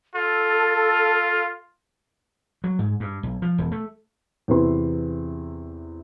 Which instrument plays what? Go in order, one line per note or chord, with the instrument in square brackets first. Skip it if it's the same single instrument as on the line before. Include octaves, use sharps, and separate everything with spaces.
[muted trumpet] F4 [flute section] A4
[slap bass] F#3
G#2
G2
B1
F3
E1
A3
[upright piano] E2 C3 E3 E4 B4 C6